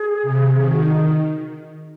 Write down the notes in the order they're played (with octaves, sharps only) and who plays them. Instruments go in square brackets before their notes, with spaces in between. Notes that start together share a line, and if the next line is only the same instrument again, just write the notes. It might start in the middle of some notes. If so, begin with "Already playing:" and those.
Already playing: [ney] G#4
[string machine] C3
[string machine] D#3 [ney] G#4
[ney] F#4
D#4